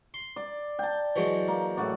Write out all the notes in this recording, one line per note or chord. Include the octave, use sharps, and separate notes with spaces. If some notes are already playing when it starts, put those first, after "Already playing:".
C6
D5
G5 A5
E3 F#3 G#3
A#3
A2 F#4 D5